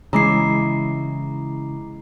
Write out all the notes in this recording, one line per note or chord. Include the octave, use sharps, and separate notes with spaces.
C#3 E3 G#3 E4 A#5 D6 C7